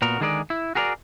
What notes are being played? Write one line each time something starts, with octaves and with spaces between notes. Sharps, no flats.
A#2 B3 F#4 A#4
D3 D#3 G#3 G#4 A#4 D5
E4
F#4 G#4 A#4 C#5 D5